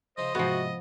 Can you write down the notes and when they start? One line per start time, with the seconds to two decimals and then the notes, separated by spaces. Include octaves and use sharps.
0.18 C#3 F3 D#4 C5 D#5
0.35 G#2 C3 F3 B3 F#4